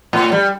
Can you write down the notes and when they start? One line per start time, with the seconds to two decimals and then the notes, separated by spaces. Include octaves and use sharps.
0.13 A2
0.32 G3